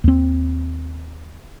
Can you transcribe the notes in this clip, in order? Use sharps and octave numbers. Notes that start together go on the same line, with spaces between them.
D#2 C4